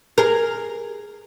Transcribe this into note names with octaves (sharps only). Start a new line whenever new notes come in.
G#4 A#4